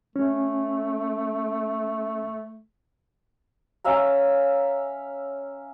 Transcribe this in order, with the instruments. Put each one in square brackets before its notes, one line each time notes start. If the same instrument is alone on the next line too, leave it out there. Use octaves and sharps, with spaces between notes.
[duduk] A3 [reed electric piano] C#4
[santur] C#4 E5 F5 A#5